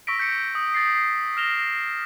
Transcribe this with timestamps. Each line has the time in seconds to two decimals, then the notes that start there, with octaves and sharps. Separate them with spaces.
0.07 C#6 D6 E6 A#6 B6 D7
0.20 G6 C#7 D7
0.55 D#6
0.74 G6 A6 A#6 C7
1.37 F6 A#6 E7 F7 G7